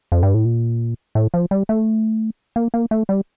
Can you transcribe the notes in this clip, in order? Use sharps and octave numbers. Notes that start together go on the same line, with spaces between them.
F2
G2
A2
A#2
A2
F3
G3
A3
A#3
A#3
A3
G3